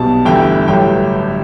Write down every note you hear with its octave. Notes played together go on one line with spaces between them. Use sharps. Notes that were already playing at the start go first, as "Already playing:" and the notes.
Already playing: B1 B2 G3 B3 A5
G1 G2 E3 A3 E4 G5
A1 G2 F#3 A3 E4 G5